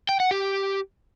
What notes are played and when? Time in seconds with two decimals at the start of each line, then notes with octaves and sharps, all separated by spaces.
0.09 G5
0.20 F#5
0.31 G4